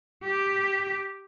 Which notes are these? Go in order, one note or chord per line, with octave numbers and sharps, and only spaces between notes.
G4